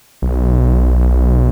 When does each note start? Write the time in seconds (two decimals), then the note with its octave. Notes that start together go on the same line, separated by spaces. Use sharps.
0.22 B1